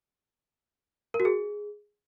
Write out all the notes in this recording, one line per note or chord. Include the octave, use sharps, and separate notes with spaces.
A#4
F#4
G#4